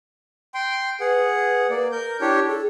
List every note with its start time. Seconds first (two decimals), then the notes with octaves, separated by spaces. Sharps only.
0.54 G5 C6
1.00 G#4 B4 F#5
1.70 A#3 D5
1.92 A#4 G6
2.21 D4 E4 G4 C#5
2.48 G#4 A4